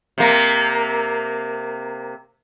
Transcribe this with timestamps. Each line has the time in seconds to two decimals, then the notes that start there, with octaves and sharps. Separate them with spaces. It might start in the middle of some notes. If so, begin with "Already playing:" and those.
0.18 C3 A#3